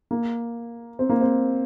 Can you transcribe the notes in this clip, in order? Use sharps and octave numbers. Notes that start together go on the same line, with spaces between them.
A#3
C4
A#3
C4